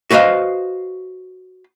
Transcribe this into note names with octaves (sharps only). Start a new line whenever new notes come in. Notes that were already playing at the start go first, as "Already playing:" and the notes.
F#4 B4 C5 D#5 F5